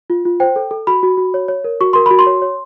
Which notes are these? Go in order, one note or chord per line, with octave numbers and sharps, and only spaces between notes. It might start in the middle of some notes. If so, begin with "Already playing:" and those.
F4
F4
C5 G5
A4
A4
F#4 B5
F#4
F#4
C#5
C#5
A#4
F#4 C#6
A#4 C6
F#4 B5
C6
C#5
C#5